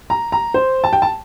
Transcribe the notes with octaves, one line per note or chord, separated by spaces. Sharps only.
A#5
A#5
C5
A5
G5
A5